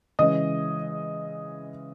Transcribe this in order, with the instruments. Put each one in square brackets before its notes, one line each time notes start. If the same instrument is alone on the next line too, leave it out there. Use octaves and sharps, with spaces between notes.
[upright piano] C#3 E3 G#3 C#4 D#5 D#6